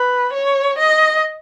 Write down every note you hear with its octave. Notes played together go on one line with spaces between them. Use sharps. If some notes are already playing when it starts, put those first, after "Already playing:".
Already playing: B4
C#5
D#5